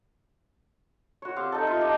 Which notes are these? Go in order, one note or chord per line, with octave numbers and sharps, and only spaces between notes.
F#4 C#5
C4 G4 F5
D#4 A4
D#4 F4 E5
D#4 G4 E5 A5